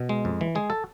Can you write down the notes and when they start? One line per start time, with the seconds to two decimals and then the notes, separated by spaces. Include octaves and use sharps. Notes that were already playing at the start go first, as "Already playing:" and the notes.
Already playing: B2
0.09 G#3
0.25 F2
0.41 E3
0.55 G#3 G#4
0.70 A4